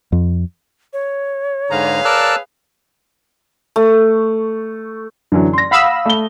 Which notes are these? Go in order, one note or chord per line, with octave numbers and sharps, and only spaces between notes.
F2
C#5
G#2 D3 G#4 B4 F5 A#5
A#4 D5 A5 E6 F#6
A3
F#2 D3 E3 F#3
C6 A#6
F5 F#5 B5 D#6 E6
A3 G7